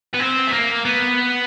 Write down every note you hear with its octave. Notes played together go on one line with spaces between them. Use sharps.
B3
C4
A3
A#3
B3